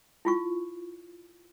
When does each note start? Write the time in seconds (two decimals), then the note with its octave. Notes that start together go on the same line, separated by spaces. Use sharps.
0.25 E4 F4 C#6